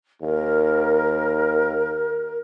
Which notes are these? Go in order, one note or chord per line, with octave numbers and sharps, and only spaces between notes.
D#2 A#4